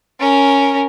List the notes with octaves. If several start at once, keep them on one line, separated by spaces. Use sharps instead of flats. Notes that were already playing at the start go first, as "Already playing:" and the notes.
C#4 A#4